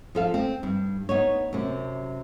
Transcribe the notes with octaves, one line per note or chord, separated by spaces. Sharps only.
F3 A4 F5
C4
G2
B3 D#4 C#5
F#2 C3